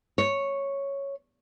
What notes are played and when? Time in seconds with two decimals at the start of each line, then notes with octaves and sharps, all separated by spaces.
0.18 C#5